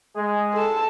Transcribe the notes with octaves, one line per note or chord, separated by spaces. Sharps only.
G#3 G#4
A4 A5